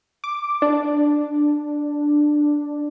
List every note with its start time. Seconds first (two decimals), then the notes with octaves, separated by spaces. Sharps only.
0.24 D6
0.62 D4